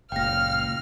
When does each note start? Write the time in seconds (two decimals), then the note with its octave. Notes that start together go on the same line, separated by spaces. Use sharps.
0.12 F#1 A#2 F5 G5 F6 A#6